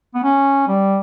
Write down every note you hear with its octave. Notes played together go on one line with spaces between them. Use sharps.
B3
C#4
G3